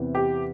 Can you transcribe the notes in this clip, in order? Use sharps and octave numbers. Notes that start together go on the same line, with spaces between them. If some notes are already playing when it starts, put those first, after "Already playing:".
Already playing: E2 C3 E3
G4